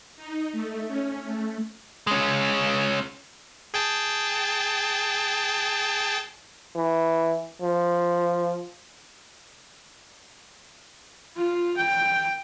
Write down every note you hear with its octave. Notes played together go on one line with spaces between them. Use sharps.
D#4
A3
C#4
A3
G#3 C#4
G#4 G5 A5
E3
F3
F4
G5